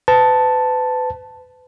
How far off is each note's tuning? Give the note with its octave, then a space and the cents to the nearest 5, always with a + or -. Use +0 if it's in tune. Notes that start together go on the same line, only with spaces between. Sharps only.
B4 +35 A5 +0